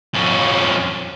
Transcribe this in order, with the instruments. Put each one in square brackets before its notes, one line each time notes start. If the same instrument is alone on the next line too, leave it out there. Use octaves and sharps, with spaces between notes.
[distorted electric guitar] F2 C#4